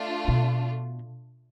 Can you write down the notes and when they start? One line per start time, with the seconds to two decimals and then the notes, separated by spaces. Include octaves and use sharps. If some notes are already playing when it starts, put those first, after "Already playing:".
Already playing: A3 D4 F4
0.28 B2